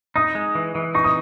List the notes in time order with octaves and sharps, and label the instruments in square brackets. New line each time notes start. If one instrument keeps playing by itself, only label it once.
[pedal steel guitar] D#4 [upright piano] D#6
[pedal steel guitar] G#3
E3
E3
[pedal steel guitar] D#4 [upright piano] C#6
[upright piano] D#6